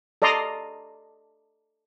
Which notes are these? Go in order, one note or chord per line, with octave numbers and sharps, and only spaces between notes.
A4 D5 D#5 A#5 C6 D#6